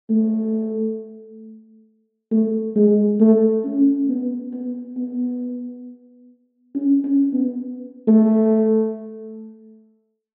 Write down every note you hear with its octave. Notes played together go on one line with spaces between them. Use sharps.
A3
A3
G#3
A3
C#4
B3
B3
B3
C#4
C#4
B3
A3